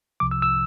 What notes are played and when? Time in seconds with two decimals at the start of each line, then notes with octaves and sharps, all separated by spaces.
0.20 C2 C3 F3 D6
0.31 E6
0.42 E6